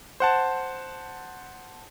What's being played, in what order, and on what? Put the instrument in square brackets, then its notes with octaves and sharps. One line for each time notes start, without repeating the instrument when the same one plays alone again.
[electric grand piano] C5 F#5 A5